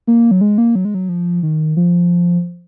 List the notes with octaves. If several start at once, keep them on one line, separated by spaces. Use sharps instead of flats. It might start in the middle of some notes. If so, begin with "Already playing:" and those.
A#3
F#3
G#3
A#3
F#3
G#3
F#3
F3
D#3
F3